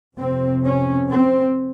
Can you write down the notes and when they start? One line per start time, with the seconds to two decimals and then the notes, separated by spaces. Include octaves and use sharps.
0.17 F2 C3 C4
0.64 C#4
1.10 C4